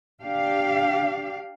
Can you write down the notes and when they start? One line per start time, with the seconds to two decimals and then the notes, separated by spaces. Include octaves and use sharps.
0.23 D4 G4 F5